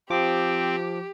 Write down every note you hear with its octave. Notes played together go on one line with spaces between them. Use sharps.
F3 C4 G4 D6